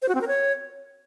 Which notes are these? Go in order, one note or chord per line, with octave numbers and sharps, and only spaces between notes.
C5
F#4
C4
A#4
C#5